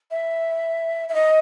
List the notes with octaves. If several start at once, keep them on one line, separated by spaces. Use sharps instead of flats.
E5
E5
D#5